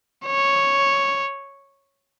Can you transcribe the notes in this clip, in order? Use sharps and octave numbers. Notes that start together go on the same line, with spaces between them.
C#5